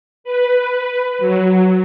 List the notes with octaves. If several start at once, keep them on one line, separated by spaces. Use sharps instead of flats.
B4
F#3